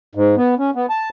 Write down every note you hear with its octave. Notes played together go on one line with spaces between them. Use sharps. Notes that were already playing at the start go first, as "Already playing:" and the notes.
G#2
B3
C#4
B3
A5